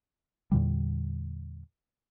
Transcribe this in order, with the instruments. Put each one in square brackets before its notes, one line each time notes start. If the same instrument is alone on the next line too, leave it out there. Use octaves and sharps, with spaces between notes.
[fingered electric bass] E2 A#2 D3 G3